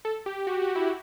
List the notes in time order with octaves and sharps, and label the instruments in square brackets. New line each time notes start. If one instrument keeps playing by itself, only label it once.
[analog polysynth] A4
G4
F#4
F#4
E4